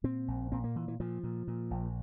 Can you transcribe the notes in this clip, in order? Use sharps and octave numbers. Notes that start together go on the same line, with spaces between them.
A#2 C4
A#1
A#2 C4
A#3
A#2 E3
E3
A#2 F3
A#2
A#2
A#1